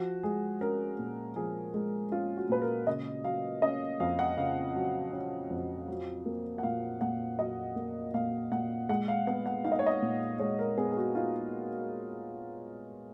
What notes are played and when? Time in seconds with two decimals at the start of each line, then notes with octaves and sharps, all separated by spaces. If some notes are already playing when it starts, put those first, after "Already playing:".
Already playing: F3 F#4
0.23 G#3 G#4
0.61 C#4 A#4
0.99 A#2
1.36 F3 G#4
1.74 G#3
2.11 C#4 F4
2.37 F#4
2.49 A#2 B4
2.62 A#4
2.87 C#3 D#5
3.24 F#3 F5
3.62 C#4 D#5
4.00 F2 F5
4.19 F#5
4.38 C#3 F5
4.75 F#3
5.13 C#4
5.50 F2
5.88 F#3
6.26 A#3
6.58 F#5
6.63 A#2 F5
7.01 A#2 F#5
7.39 F#3 D#5
7.76 A#3
8.14 A#2 F5
8.52 A#2 F#5
8.89 G#3 F#5
9.08 F5
9.27 B3 F#5
9.46 F#5
9.64 D#4 F5
9.72 D#5
9.79 C#5
9.86 D#5
10.02 A#2
10.40 G#3 C#5
10.59 A#4
10.78 B3 G#4
10.92 G#4
10.97 F#4
11.15 D#4 F4